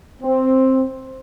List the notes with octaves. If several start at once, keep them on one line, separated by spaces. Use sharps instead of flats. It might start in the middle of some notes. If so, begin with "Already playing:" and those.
C4